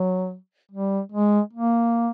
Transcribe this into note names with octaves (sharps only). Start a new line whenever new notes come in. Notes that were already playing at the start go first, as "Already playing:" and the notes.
Already playing: F#3
G3
G#3
A#3